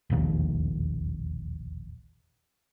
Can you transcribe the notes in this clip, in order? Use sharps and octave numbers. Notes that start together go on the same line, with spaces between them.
E1 A#1 D#2